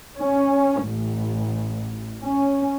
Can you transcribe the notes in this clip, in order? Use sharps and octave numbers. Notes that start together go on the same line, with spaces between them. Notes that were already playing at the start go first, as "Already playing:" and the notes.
C#4
A1
C#4